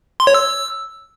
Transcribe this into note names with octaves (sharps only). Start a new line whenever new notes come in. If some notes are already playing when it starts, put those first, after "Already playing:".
C6
C#5
E6